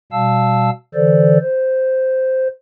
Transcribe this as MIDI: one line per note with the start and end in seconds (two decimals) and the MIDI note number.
0.12 0.70 47
0.12 0.70 55
0.12 0.70 77
0.12 0.70 81
0.12 0.70 88
0.94 1.38 50
0.94 1.38 52
0.94 1.38 69
0.94 1.38 72
0.94 1.38 74
1.41 2.48 72